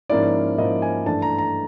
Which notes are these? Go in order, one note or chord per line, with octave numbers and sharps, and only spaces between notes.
G#2 F3 A#3 C#4 E4 D5
G#2 F3 A#3 C#4 E4 D#5
G#5
G2 E3 A3 D4 A5
A#5
A#5